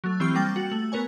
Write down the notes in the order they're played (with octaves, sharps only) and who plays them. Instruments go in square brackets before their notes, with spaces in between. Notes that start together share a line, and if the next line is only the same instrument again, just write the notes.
[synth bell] F#3 A3
E3 C4 G4 C#6 F6
G3 A#3 G5 A6
F#4
A3 F#7
B3 A#4 C#5 G#5